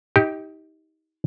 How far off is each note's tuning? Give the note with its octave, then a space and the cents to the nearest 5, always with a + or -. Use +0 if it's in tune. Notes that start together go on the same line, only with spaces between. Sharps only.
D#4 +30 G4 +0 G5 +0